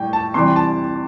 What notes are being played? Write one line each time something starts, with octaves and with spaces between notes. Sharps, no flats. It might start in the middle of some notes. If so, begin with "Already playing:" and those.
Already playing: A2 G3 G5
A5
C3 E3 G3 C6
A5